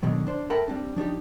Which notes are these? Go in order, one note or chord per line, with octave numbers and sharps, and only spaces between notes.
B2 D3 D#3 F#3
D4 C5
A4 A#4 E5 F#5 G5 B5
G3 C4 D4
F3 D4 D#4 G4